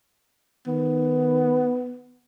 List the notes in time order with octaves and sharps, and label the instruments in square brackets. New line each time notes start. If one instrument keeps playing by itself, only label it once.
[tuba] D#3 [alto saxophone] B3